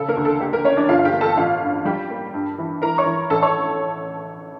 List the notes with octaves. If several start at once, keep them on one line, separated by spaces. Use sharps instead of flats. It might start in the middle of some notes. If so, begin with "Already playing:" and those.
Already playing: C#3 A4
A#3 A#4
D2
A4
A#3 G4
A#3 A#4
A#3 C#4 C#5
D4 D5
G1 F4 F5
F5
G4 G5
A#3
A4 A5
A1 F4 F5
G2
G3 G4 G5
A#3
G2
E3
E3 A#4 A#5
C#5 C#6
E3
A1 A4 A5
C#5 C#6